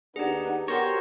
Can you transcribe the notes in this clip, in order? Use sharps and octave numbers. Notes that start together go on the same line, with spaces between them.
D#2 B3 D4 D#4 G4 G#4
B3 F#4 G4 A#4 C5 C#5 A#6